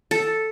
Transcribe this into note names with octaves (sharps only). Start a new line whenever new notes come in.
A4